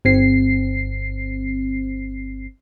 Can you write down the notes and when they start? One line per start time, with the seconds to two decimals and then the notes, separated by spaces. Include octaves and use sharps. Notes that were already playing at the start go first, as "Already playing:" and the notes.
0.05 G1 C4 C7